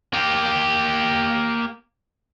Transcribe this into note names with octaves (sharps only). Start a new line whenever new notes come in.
A#3 G4